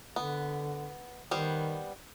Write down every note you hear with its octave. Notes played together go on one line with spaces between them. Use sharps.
D3 B3
D#3 G3 B3 C5